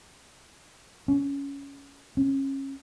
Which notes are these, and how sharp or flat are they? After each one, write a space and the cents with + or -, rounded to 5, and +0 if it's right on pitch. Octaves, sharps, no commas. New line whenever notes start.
C#4 +15
C#4 -30